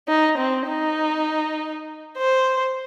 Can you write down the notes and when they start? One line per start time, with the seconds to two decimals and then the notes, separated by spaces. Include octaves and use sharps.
0.08 D#4
0.38 C4
0.68 D#4
2.18 C5